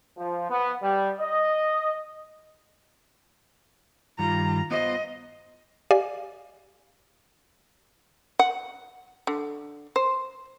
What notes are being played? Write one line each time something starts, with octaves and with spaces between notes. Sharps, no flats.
F3
B3
G3
D#5
G2 D#3 G3 F4 A#5
B3 F4 C5 D#5
G4 D5 D#5 F5 G#5
F#5
D3
C5